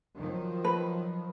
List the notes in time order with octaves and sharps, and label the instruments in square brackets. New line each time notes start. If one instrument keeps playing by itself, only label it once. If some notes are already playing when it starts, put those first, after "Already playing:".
[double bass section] D#3 F3 F#3
[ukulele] B4